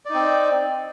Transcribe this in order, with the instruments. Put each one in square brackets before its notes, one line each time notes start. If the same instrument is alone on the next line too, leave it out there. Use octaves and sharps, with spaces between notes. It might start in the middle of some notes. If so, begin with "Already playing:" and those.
[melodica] D5
D#4
C4